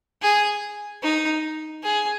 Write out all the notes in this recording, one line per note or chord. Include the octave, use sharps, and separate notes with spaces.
G#4
D#4
G#4